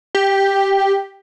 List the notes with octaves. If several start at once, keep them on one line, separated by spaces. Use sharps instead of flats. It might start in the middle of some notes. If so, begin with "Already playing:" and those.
G4